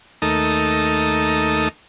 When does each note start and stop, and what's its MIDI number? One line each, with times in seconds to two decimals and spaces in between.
0.22 1.68 39
0.22 1.68 57
0.22 1.68 63
0.22 1.68 69
0.22 1.68 70
0.22 1.68 87